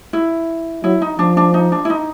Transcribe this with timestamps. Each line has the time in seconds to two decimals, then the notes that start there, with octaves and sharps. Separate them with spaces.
0.13 E4
0.84 F#3 E4
1.02 D#4
1.19 F3 D4
1.37 D4
1.54 D#4
1.72 D4
1.85 E4
1.90 D#4